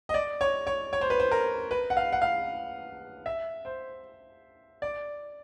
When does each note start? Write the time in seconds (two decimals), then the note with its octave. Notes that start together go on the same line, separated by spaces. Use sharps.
0.09 D#5
0.14 D5
0.41 C#5
0.67 C#5
0.93 C#5
1.01 C5
1.10 B4
1.20 C5
1.31 A#4
1.71 B4
1.90 F#5
1.97 F5
2.13 F#5
2.22 F5
3.26 E5
3.65 C5
4.82 D5